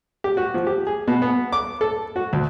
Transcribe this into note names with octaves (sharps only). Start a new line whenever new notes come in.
G4
F#4
F3
G4
G#4
B2
B3
D6
A4
F#4
D2